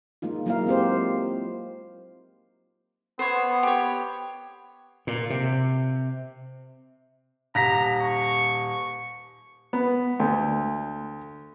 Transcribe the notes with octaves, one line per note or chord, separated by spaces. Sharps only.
G#3 A#3 D#4 F4
F#3 G#3 A#3 E4 A#4 F5
C4 F4 G4 C5
B3 C5 C#5
G4 C#5
A#2
C3
D#1 A#5 A#6 B6
C#6
B3
D2